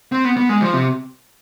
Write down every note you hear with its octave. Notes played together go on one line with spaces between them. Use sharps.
C4
B3
B3
G#3
F3
C3